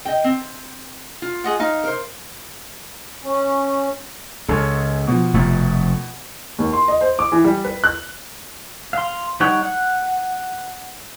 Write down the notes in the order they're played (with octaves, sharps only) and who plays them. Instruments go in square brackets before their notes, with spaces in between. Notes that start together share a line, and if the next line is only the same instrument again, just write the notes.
[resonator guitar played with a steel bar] D#5 G5
C4
F4
[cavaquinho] G#4 D#5 F#5
D#4 F5
[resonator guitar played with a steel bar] A#4 C5
[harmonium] C#4
[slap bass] C#2 [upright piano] A4 C#5
[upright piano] B2 F3
[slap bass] F1 C3 A3
[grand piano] D#2
C6
D#5
C5
D6
E3
G3
B4
F#6
[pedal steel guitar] F5 C6
G3 D#4 C#5 F#5 G5
F#5